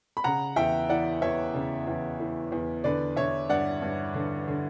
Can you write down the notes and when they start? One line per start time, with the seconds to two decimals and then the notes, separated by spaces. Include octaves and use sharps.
0.17 B5
0.24 C#3 F#5 A#5
0.56 E2 E5 G5
0.89 E3 D5 F#5
1.22 E2 C#5 E5
1.54 C#3
1.87 E2
2.20 E3
2.52 E2
2.84 D3 B4 D5
3.16 D3 C#5 E5
3.49 G2 D5 F#5
3.82 G2
4.14 D3
4.48 D3